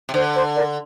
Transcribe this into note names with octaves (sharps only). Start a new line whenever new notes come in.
C3
D3 C5
C5
A#4 D5